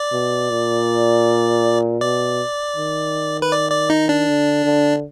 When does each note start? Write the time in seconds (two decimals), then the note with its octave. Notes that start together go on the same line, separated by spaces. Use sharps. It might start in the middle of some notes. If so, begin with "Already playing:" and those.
Already playing: D5
0.12 B2
0.50 A#2
2.01 B2 D5
2.76 D#3
3.42 B4
3.52 D5
3.71 D5
3.90 D#4
4.09 D4
4.28 D3
4.65 D3